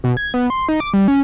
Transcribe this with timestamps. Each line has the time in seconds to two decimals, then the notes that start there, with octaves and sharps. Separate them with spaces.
0.04 B2
0.17 G#6
0.34 B3
0.50 C6
0.69 D#4
0.80 D6
0.93 G3
1.08 C#4